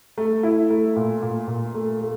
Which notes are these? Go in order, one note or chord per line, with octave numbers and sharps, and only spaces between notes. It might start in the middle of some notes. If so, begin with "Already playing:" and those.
A3
E4
A3
A#2
A#2
A#2
A3
A3